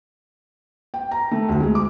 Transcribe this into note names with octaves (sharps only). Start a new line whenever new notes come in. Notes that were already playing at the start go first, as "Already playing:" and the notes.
G5
A#5
A3
D2
G#3
D6